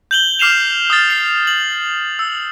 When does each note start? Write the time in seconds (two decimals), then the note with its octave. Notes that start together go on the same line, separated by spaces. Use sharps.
0.11 G6 F#7 G7
0.39 D6 F6 C7 E7 F7
0.90 D#6 F6 A6
1.10 C7
1.47 F#7
2.19 E6